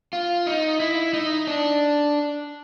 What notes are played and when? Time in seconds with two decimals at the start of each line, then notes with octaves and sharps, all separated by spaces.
0.13 F4
0.46 D#4
0.80 E4
1.14 D#4
1.47 D4